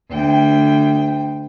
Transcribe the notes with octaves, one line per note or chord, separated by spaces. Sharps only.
D2 G5